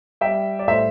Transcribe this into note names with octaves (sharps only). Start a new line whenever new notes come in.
G3 E5 G5
D5
A2 C5 E5